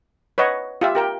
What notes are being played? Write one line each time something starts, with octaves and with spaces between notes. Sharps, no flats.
B4 C#5 D#5 F#5
F4 G4 E5
G4 A#4 G5